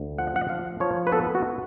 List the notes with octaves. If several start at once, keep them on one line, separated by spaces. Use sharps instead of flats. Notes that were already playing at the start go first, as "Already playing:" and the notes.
Already playing: D2
F3 F#5
F#5
F3 F5
F3 C#5
B4
B3 A4
F#4